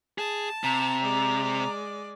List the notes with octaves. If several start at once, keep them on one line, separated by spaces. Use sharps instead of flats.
G#4 A5
C3 A#5
G#3 D5